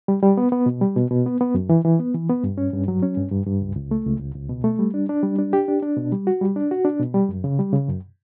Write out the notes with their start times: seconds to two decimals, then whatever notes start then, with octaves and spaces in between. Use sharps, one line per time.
0.08 G3
0.23 G3
0.37 B3
0.52 B3
0.66 B2
0.81 G3
0.96 B2
1.11 B2
1.26 B3
1.41 B3
1.55 F#2
1.69 E3
1.85 E3
1.99 B3
2.14 E3
2.29 B3
2.44 G2
2.58 C#4
2.73 G2
2.88 F#3
3.03 C#4
3.17 G2
3.32 G2
3.46 G2
3.62 C#2
3.76 C#2
3.91 A3
4.06 C#2
4.20 C#2
4.35 C#2
4.49 B2
4.64 A3
4.79 G3
4.94 D4
5.09 D4
5.23 G3
5.39 D4
5.53 G4
5.68 D4
5.83 D4
5.96 B2
6.12 G3
6.27 F#4
6.41 G3
6.56 D4
6.71 F#4
6.85 D4
6.99 B2
7.14 G3
7.29 F#2
7.44 C#3
7.59 G3
7.73 C#3
7.88 F#2